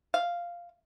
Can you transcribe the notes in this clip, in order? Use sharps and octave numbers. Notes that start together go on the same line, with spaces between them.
F5